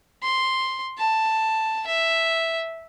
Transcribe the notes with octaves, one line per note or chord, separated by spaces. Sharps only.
C6
A5
E5